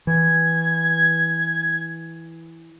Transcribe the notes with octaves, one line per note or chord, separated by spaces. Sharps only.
E3 G#6